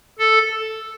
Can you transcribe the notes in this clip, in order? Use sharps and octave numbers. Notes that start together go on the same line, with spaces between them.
A4